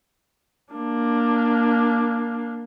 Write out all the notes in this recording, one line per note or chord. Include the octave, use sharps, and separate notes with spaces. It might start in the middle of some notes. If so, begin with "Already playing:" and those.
A#3 D4